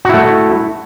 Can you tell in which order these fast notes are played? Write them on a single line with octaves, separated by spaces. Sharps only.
F#4 E4 A3